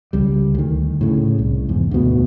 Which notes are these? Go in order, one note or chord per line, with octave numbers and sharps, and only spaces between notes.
C#2 G3
D2 D#3
A2 C#3
C2
E2 G#2
D2 G#2 B2